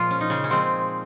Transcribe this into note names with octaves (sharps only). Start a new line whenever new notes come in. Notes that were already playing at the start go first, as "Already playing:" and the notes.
Already playing: A#2 F3 G#3 F4
C#4
D#4
C#3 C#4
C#4
A#2 F3 G#3 C4